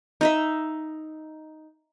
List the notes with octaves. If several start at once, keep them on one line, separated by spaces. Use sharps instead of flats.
D#4 D#5 E5